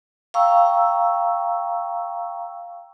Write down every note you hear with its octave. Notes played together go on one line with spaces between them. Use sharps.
F5 G5 A#5 C#6 E6